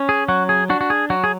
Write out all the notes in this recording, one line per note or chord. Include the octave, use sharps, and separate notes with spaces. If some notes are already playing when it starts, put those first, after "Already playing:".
Already playing: C#4
G#4
F#3 F#4
G#4
D4 F#4
F#4
G#4
F#3 F#4
G#4